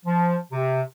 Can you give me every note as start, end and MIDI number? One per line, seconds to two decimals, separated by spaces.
0.05 0.37 53
0.51 0.82 48